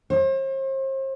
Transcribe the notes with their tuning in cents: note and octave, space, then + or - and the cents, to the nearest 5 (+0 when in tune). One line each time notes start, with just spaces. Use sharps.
C5 +40